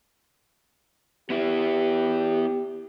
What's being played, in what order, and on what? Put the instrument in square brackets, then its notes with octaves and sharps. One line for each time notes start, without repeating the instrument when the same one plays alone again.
[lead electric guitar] B3 E4 [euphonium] G4